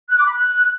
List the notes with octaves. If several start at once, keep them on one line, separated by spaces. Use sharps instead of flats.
F#6
D6
B5
F#6